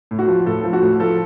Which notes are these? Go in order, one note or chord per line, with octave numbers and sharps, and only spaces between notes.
A2
F#4
F3
A2 A4
F3
F#4
A2
F3 A4